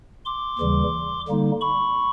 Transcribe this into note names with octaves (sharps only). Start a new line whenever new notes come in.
C6 D6
D#2 C#3 E3 G3
D3 G3 A#3 D#4
B5 C#6